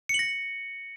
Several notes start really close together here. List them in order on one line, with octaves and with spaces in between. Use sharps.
C#7 F#7 A#6